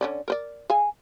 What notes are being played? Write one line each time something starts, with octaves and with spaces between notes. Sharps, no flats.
D3 C#4 D5
A#4 B4 D5
G#4 F5 G#5